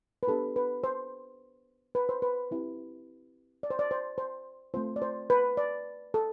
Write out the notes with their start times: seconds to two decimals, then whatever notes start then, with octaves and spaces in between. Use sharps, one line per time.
0.23 B4
0.28 B3 D4 G4 A4
0.56 B4
0.84 C5
1.95 B4
2.09 C5
2.22 B4
2.51 C4 E4 G4
3.63 D5
3.70 C5
3.79 D5
3.91 C5
4.18 C5
4.74 A3 C4 F4 C5
4.96 D5
5.02 C5
5.30 B4
5.57 D5
6.14 A4